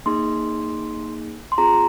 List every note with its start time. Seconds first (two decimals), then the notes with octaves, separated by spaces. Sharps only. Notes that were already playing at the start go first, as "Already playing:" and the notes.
0.06 A#3 D#4 G#4 C6
1.52 C6
1.58 C4 F4 G#4 A#5